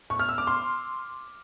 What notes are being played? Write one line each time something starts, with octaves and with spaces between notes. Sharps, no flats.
C#6
F6
E6
D6
C6